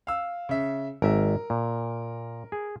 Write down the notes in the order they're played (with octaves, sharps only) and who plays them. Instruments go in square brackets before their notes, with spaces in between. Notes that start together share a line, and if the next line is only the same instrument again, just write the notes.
[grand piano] F5 E6
C#3 E5
[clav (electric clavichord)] G#1 E5 [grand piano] A#4
[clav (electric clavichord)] A#2
G#4